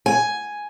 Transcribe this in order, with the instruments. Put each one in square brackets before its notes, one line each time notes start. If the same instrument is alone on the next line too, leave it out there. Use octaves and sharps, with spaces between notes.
[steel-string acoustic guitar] G#5